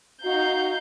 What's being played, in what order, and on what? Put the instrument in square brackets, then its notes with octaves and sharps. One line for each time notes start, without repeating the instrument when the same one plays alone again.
[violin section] D#4 F5 G6 [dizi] F#4